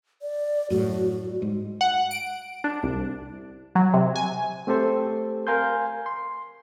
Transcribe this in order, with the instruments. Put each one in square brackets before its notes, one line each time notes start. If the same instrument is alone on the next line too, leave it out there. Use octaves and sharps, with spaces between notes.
[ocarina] D5
[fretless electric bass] F#2 A2 [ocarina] F#4
[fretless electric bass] G#2
[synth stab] F#5
D7
D4
C2
F#3
C3
G#5
[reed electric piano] A3 C4 G4 A4 C5
A#4 F5 G#5 C6 G6
C6